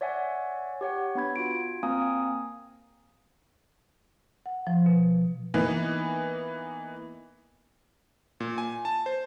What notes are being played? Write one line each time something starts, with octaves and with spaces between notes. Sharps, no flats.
C#5 D5 E5 F#5 G#5
G4 C#5 F#5
B3 D4 B5 G#6
F4 F#4 D7
A#3 C4 F5 G#5 A#5 D#6
F#5
F3
B2
E3 A#3 B3 D#4
A#2
G#5
A5
C5